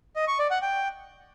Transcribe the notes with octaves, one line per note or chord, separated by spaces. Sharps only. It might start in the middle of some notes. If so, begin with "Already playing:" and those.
D#5
C#6
D5
F#5
G5